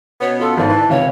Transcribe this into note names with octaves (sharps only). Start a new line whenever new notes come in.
B2 B3 C#4 C#5
F4 A4 A5
G#1 G#2 D5 A5
D3 E3 B4
C#2 C3 D#3 C#5 F5